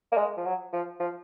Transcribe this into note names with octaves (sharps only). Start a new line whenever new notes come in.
A#3
G#3
F3
F#3
F3
F3